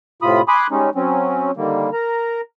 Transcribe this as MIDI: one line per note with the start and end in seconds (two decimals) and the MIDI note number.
0.22 0.41 45
0.22 0.41 48
0.22 0.41 65
0.22 0.41 83
0.22 0.41 87
0.48 0.67 80
0.48 0.67 83
0.48 0.67 84
0.48 0.67 86
0.48 0.67 87
0.48 0.67 90
0.71 0.90 55
0.71 0.90 56
0.71 0.90 61
0.71 0.90 63
0.95 1.51 54
0.95 1.51 60
0.95 1.51 61
1.57 1.90 50
1.57 1.90 51
1.57 1.90 55
1.57 1.90 58
1.93 2.41 70
1.93 2.41 82